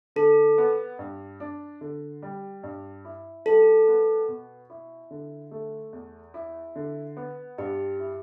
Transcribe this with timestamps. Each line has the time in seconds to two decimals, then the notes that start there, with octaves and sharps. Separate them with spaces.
0.16 D3 A4
0.58 B3
0.99 G2
1.40 D4
1.81 D3
2.22 G3
2.63 G2
3.05 E4
3.46 G3 A4
3.88 B3
4.28 B2
4.70 E4
5.11 D3
5.51 A3
5.93 E2
6.34 E4
6.76 D3
7.17 B3
7.58 G2 G4
7.99 E4